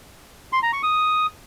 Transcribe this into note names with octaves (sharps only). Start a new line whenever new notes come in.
C6
A#5
C#6
D#6